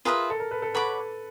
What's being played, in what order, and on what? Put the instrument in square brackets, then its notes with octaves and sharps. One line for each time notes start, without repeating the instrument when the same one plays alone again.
[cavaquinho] F4 G#4 B4 E5 [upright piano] A#4
[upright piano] A4
A#4
A4 B4
A4 B4
[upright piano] A4 B4 [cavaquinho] C#5 F#5 B5 D6